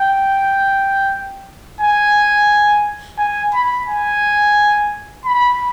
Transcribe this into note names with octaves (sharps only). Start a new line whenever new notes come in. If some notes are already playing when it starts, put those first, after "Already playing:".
Already playing: G5
G#5
G#5
B5
G#5
B5